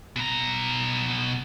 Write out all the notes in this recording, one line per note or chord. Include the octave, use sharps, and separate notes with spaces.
B2 A#5